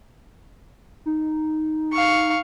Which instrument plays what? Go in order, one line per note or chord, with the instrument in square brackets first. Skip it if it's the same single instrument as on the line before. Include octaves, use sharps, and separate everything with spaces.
[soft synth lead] D#4
[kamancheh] F5 C#6